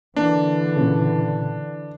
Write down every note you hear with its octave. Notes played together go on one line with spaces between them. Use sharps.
D3 E3 A#3 D4
A#2 C#3